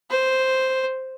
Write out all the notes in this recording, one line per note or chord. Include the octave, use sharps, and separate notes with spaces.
C5